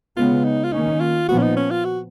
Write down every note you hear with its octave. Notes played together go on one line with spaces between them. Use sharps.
C#3 G#3 B3 F4
D#4
F4
D#3 A#3 C#4 D#4
F4
A#2 F3 B3 F#4
C#4
D#4
C#4
F4
F#4